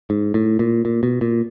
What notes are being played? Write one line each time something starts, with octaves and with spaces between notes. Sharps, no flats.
G#2
A2
A#2
A#2
B2
A#2